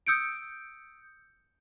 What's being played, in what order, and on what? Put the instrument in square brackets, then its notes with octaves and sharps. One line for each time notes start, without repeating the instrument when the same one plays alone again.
[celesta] D#6 E6 G6 C#7 D7